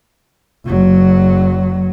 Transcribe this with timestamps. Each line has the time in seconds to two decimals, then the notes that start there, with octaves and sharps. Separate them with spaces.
0.67 F#1 F#3